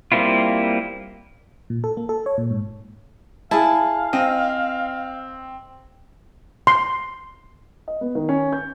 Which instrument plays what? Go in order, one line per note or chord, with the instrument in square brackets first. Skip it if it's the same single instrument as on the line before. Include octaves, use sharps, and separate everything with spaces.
[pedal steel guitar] G3 A#3 C4 E4 F4
[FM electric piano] A#2
A4
A#3
A4
C#5
A#2
G#2
[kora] E4 G#4 [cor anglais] F5 [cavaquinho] A5
[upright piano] C4 [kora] D#5
[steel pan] C6
[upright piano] D#5
B3
D#3
C#4
G6